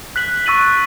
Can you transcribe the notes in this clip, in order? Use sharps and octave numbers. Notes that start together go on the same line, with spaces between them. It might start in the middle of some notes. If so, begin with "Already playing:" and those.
F#6 B6 F#7
C#6 E6 A6 D#7 F#7